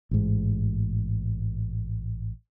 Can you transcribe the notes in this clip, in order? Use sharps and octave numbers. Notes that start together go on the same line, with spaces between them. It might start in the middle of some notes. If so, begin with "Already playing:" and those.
A1 G#2